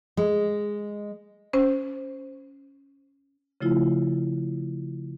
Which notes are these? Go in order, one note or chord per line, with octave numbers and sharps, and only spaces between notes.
G#3
C#4 C5
C#3 F3 A3 E4 F4